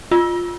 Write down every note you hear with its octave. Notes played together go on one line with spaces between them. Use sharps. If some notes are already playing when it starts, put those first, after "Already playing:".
F4